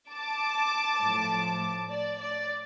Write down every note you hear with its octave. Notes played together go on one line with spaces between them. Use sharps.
A5 D6
A2 F3
D5
D5